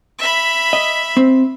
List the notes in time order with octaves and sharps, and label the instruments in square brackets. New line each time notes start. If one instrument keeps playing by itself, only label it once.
[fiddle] E5 B5
[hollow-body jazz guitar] D#5
C4